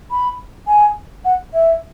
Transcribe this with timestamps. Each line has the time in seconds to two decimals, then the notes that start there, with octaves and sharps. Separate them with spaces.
0.11 B5
0.67 G#5
1.25 F#5
1.54 E5